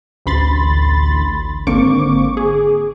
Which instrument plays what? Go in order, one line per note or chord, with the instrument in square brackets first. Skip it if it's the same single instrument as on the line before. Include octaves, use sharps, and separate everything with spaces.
[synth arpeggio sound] A1 D2 B5 C6 A6
G#1 D3 A#3 C4 C#6 D6
G#4